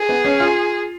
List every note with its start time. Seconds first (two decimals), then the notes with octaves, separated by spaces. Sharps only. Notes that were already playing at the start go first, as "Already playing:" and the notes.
Already playing: G#4
0.09 B3
0.25 C#4
0.40 F4